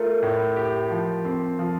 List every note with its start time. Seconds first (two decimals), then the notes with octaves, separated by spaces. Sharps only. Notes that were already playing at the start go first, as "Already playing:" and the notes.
Already playing: A3 F4 A#4
0.22 A2
0.56 G4
0.91 F3
1.25 C4
1.59 F3